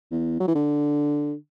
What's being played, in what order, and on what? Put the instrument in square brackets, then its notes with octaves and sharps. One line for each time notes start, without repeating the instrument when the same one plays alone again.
[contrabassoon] E2
F#3
E3
D3